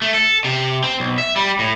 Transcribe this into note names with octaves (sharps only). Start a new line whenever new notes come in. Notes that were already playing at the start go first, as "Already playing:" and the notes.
A3
A4
C3
C4
B1
E5
G3
A2